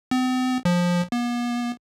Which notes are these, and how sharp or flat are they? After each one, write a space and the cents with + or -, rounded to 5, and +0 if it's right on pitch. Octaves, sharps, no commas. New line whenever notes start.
C4 -45
F3 +15
B3 -45